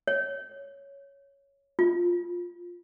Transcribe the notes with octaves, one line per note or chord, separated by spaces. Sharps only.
C#5
F4